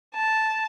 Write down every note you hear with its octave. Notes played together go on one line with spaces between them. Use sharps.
A5